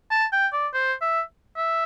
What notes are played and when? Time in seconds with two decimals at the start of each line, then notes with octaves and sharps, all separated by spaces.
0.11 A5
0.32 G5
0.53 D5
0.74 C5
1.01 E5
1.57 E5